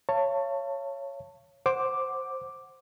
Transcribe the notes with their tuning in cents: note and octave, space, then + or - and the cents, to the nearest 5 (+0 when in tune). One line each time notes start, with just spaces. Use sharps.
C#5 +0 F5 -40 A5 +25
C5 +10 F#5 +0 D6 +0